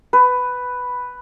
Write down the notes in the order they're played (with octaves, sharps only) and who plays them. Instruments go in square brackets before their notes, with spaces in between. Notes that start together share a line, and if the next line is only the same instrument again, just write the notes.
[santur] B4